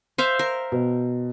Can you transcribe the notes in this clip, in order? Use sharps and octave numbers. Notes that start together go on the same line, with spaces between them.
C5 E5 F5
A#4
B2